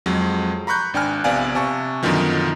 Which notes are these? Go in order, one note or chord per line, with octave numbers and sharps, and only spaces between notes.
F2 F#3 G#3
A#5 B5 C#6 F#6 G6
G#1 D4 G5 G#5 F6
A#1 C3 B3 D5 F5 G#5
C3 G#5 A5 C#6
F#2 B2 D3 D#3 F3